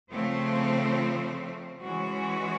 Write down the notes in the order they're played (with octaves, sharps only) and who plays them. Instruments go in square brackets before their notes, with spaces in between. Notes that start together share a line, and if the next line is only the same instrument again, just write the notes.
[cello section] C#3 F3 A3 C4
E3 G#3 C#4 F#4